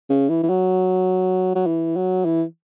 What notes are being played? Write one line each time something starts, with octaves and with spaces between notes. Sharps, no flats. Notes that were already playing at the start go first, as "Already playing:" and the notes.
C#3
E3
E3
F#3
F#3
E3
F#3
E3